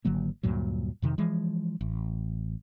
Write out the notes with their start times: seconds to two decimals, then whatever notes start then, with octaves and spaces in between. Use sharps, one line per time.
0.05 G#1 D3 F#3 A#3
0.43 D2 G2 A#2 F#3
1.02 F2 C3 D#3
1.18 E3 F3 G#3
1.81 A1